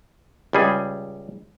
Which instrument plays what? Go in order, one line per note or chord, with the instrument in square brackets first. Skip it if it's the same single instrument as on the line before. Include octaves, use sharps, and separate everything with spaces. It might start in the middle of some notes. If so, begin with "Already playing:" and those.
[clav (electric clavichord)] C#2 G3 G#4